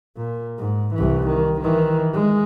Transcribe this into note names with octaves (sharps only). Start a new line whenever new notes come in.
A#2
G#2
C2 E3
D#3
D#3 E3
G#3